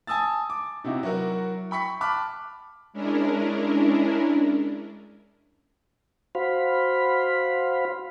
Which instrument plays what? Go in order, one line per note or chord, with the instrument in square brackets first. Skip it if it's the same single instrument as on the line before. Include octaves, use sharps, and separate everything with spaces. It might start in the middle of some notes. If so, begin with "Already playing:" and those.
[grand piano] G#5 A5 D#6 E6 A6
D6
C3 D#4 E4 F#4
F#3 E4 F#4 A#4
G5 B5 C#6 B6
A5 B5 D6 F6 F#6
[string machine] G#3 C#4 D4 E4 A#4
[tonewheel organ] F#4 C5 F5 B5